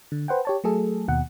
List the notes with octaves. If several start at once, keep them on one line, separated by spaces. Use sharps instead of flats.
D3
B4 C5 F#5 G5
G4 C#5 A5
F#3 A3 G#4 A4
D#2 B2 F#5